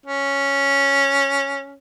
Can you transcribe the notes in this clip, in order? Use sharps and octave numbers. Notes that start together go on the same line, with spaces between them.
C#4